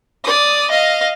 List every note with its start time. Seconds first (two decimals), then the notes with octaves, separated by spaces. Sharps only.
0.24 D5 D#6
0.70 D#5 F5